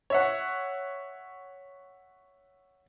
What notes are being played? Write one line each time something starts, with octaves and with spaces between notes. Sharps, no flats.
C#5 E5 F#5